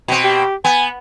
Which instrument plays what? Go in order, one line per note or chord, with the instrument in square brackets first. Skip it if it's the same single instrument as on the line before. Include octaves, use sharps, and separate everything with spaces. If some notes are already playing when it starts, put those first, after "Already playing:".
[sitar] B2 C4
[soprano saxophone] G4
[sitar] B3 [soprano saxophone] G#5